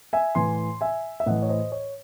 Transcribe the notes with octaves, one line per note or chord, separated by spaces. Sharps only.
E5 G#5
A2 E3 G#5 C6
E5 G#5
E5
A2 E3 D#5 F#5
C#5
C5 D#5
C#5